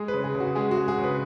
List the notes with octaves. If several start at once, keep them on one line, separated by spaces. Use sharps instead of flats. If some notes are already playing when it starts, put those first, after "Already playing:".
Already playing: G#3 G#4
B4
C#3
G#4
C#3
F#4
G#3 G#4
F#4
G#3
G#4
C#3
B4